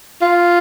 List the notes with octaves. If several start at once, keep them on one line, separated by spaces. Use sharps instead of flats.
F4